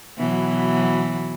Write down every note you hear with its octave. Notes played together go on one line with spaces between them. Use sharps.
B2 E3 F#3